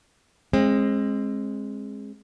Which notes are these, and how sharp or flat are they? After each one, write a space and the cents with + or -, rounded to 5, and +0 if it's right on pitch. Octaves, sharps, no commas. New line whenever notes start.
G#3 +0 C4 +35